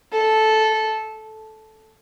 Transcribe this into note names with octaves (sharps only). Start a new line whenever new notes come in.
A4